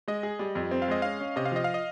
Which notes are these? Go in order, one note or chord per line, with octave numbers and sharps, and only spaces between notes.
G#3 D#5
G#4
G3
F2
C4
F5
G#3 D#5
C#4 F5
C#4
C3 D#5
F5
F3 D#5
F5
D#5